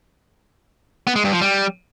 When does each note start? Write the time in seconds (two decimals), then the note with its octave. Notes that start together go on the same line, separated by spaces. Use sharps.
1.07 B3
1.16 G#3
1.24 G2
1.33 F3
1.41 G3